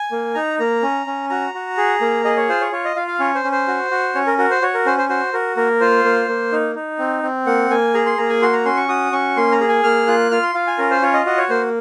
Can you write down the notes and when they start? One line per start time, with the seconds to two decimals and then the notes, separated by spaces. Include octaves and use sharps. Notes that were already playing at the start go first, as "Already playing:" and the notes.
Already playing: G#5
0.11 A#3
0.35 D#4 A#5
0.59 A#3 A#5
0.83 C#4
1.06 C#4
1.30 F#4 A#5
1.54 F#4
1.77 G#4
2.01 A#3
2.25 G#4 D#5
2.37 C#5
2.49 F4 C5
2.61 C#5
2.72 F4 C#5
2.85 D#5
2.96 F4 F5
3.07 F5
3.19 C#4 C#5
3.35 C5
3.44 C#4
3.52 C5
3.68 F#4
3.91 F#4
4.15 C#4 C#5
4.27 A#4
4.38 F#4 A#4
4.51 C5
4.62 F#4 C#5
4.74 A#4
4.86 C#4 C5
4.98 C5
5.09 F#4 C5
5.33 F#4 A#4
5.57 A#3 A#4
5.80 F4 C5
6.04 A#3
6.28 A#3
6.52 D#4
6.75 D#4
6.99 C4
7.23 C4
7.46 A#3 F#5
7.70 A#3 G#5
7.94 G#4 A#5
8.06 C6
8.18 A#3 A#5
8.29 G#5
8.42 F#4 C6
8.53 A#5
8.65 C#4 C6
8.77 C#6
8.89 F#4 D#6
9.12 C#4 C#6
9.37 A#3 C6
9.52 A#5
9.61 G#4
9.68 G#5
9.83 A#3 F6
10.07 F4 F#6
10.31 F4 F6
10.43 C6
10.55 F4 F5
10.67 G#5
10.78 C#4 A#4
10.91 C5
11.02 F4 C#5
11.14 D#5
11.26 F#4 D#5
11.38 C#5
11.49 A#3 C5